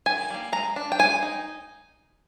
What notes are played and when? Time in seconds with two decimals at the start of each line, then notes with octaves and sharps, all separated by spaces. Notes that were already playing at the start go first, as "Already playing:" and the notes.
0.06 D#3 G#5
0.30 G3 A#3
0.52 G#3 A#5
0.76 D4
0.92 G5
0.99 G#3 G#5
1.23 D#4